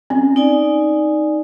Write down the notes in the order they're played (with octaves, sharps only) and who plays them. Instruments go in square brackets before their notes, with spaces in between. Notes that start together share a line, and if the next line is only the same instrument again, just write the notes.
[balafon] C4 C#4
[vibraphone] D#4 D5 G#5